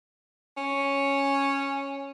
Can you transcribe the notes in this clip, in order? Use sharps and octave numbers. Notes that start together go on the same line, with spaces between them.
C#4